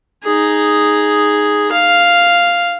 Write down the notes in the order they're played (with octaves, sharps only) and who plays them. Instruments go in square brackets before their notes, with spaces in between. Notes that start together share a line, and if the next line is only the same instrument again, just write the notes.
[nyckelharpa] D#4 G#4
F5